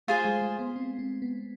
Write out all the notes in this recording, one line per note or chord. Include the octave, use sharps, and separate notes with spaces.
A3 F4 G#4 C5 G#5
G#3
A3
B3
C4
C4
B3